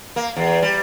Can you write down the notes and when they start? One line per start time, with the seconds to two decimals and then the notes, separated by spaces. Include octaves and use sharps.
0.16 A#3
0.36 E2
0.62 G3